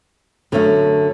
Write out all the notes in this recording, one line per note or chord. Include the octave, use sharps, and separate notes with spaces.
F#2 D3 A3 C#4